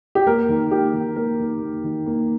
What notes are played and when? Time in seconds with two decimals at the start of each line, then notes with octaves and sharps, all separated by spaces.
0.15 G4
0.27 A#3 A#4
0.49 D#3
0.71 A#3 G4
0.94 D#3
1.16 A#3 A#4
1.40 D#3
1.62 A#3
1.84 D#3
2.06 A#3